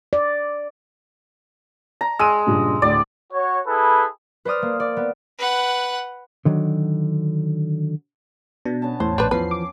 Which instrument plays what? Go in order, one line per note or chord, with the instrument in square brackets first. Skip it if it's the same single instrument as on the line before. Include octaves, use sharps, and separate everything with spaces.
[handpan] D5
[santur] A#5
[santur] G#3 [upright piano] E6 D#7
[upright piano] G2 A#2 C#3
[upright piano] D2 A2 [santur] D5
[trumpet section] F#4 C#5
E4 G#4 A4 B4
[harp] B4 C5 D5 D#6 F6
A#3
D5
B3
[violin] B4 F#5
[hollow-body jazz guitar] D3 D#3 F#3
[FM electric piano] B2 [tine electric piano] D4
[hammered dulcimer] B3 C#4 A5
[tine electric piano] E2 [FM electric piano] A2 [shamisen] C5
[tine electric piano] A#1 C5 D5 [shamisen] D4 B4
[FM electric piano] E2 C7 [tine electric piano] E3 F3 [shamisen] B4
[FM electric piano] D6